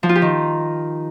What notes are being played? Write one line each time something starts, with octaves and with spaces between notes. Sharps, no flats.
F3
F4
G4
D#3